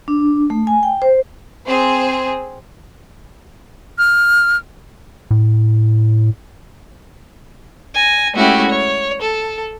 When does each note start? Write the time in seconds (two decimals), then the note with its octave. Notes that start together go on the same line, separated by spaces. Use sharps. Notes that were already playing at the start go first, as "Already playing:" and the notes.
0.08 D4
0.50 A3
0.67 G#5
0.83 G5
1.02 C5
1.66 C4 G#4 C5
3.98 F6
5.31 A2
7.94 G#5 A#6
8.34 G#3 A3 C#4 E4 F#4 G4
8.69 C#5
9.21 A4